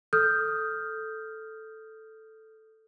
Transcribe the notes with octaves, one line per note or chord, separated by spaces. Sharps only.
A4 D#6 F6 G6